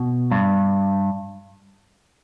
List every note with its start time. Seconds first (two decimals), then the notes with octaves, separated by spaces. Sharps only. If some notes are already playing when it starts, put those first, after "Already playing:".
Already playing: B2
0.31 G2